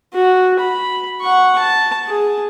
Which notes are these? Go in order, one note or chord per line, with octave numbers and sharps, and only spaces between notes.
F#4
B5
F#5 C#6
A5
G#4